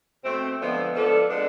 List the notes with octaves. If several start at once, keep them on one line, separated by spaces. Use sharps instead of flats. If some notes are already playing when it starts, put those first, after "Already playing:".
B2 A3 C4
D3 F3 G#3 B3
F3 B3 D4 A4
D3 G#3 B3 D4